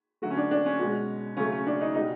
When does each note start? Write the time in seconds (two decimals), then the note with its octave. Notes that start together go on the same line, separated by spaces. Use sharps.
0.22 D3 F#3 A3 F#4
0.31 C#4
0.37 D4
0.51 D4
0.66 C#4
0.79 B2 G#3
1.37 C#3 F#3 A3 C#4
1.52 C#4
1.67 D4
1.81 D#4
1.95 B2 G3 D#4